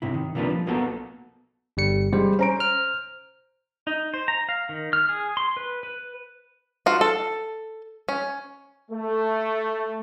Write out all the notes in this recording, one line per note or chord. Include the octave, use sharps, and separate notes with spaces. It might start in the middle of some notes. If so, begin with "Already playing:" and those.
G#2 C3 E4
D#3
C3 F3 A#3 D4 B4
F3
B1 A#3 B3 F#4 A4
G1 G3 C#7
G3 G#3 C5
C#4 C5 A#5 D7
F6
D#4
C5
A#5
F5
D#3
F6
G#4
C6
B4
B4
F4 F#4
A4
C#4
A3